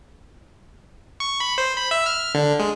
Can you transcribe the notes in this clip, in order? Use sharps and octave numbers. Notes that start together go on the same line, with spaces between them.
C#6
B5
C5
B5
E5
F6
D3
G#3